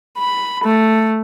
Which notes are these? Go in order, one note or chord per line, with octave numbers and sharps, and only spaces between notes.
B5
A3